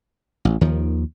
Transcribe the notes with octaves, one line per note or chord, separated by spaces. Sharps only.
A1
D#2 D#3 F3